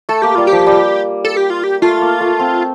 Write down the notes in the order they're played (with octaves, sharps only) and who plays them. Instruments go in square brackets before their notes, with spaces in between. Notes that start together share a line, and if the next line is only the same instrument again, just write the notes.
[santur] A3 [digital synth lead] A4
[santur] A#3 [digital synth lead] G4
[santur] G3 [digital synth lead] F4
[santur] F3 [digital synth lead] G4
[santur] G3
[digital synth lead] A4
G4
F4
G4
[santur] A3 [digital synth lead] F4
[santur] A#3
A3
C4